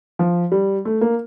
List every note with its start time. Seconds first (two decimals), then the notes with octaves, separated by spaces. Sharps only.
0.19 F3
0.52 G3
0.85 A3
1.01 A#3